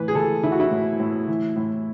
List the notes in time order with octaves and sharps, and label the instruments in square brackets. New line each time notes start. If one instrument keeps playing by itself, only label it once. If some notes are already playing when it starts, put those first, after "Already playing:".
Already playing: [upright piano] A2 E3 B4
G#4
E3 A4
E3 E4
F#4
E4
A2
A2
E3
A2